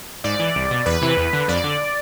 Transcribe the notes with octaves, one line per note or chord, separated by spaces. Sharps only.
G#2 D5
E3
C2
B2
E2 B4
C3 E3
E2
D3
F2 D5
D3